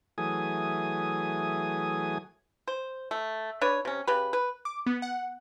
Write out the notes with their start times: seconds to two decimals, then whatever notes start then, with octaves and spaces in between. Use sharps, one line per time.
0.18 E3 F#3 A3 G#4 G#5 D#6
2.67 C5
3.11 A3
3.61 D4 B4 C#5
3.85 C3 C#4
4.07 C#3 G4 B4
4.33 B4
4.65 D6
4.86 B3
5.02 F#5